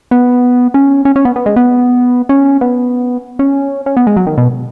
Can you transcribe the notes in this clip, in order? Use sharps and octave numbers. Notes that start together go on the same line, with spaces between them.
B3
C#4
C#4
C#4
B3
B3
G#3
B3
C#4
B3
C#4
C#4
B3
G#3
F#3
D#3
B2